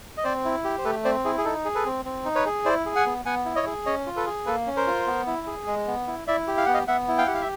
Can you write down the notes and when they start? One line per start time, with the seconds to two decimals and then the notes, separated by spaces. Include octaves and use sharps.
0.17 D#5
0.24 C4 C5 D5
0.45 E4
0.64 G4
0.78 C5
0.84 A3 A4 B4
1.05 C4 C5 D5
1.25 E4 G#4
1.38 G#4
1.45 D#4 A4
1.65 G#4
1.75 A4 B4
1.85 C4
2.05 C4
2.25 D#4
2.35 B4 C#5
2.46 G#4
2.65 E4 C5 D5
2.86 G#4
2.96 F#5 G#5
3.06 B3
3.25 B3 F#5 G#5
3.45 E4
3.56 C#5 D#5
3.66 G#4
3.86 C#4 C#5 D#5
4.06 F4
4.16 A4 B4
4.26 G#4
4.46 A#3 A4 B4
4.67 C#4
4.76 A#4 C5
4.86 F4
5.06 B3
5.27 E4
5.47 G#4
5.67 G#3
5.87 B3
6.07 E4
6.27 E4 D5 E5
6.47 G4
6.57 F5
6.66 B3 F#5
6.74 D#5 F5
6.88 B3 E5 F#5
7.08 E4
7.18 F5 G5
7.27 G4 F#5
7.34 F5
7.41 E5